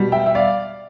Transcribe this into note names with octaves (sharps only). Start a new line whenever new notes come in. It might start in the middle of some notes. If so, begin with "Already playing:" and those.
Already playing: B2 G3
E5 G5
E5
D5 F5